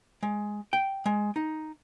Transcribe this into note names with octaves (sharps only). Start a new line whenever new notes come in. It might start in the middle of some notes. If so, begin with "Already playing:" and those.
G#3
G5
G#3
D#4